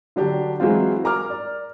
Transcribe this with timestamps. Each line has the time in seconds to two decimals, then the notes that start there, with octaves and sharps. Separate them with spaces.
0.16 D3 F#3 D4 G4
0.60 E3 F#3 G#3 C4 F4
1.04 A#4 A#5 D6 F6
1.30 D5